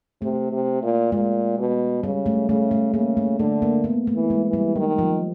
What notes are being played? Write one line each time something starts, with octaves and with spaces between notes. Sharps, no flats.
C3 A3
C3
A#2
A#2 G#3
B2
C#3 G3
A3
C#3 A3
A3
C#3 A#3
A3
D3 A3
A#3
B3
A3
E3
G#3
E3
G3
D#3 F#3
F3